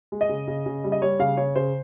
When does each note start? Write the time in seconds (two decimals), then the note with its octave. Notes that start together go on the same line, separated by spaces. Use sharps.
0.12 G#3
0.21 D#5
0.29 C#3
0.48 C#3
0.66 C#3
0.84 G3
0.92 D#5
1.02 G3 C#5
1.19 C#3 F5
1.37 C#3 C#5
1.56 C#3 C5